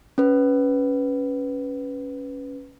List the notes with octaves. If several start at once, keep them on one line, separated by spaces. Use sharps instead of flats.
C#4 B4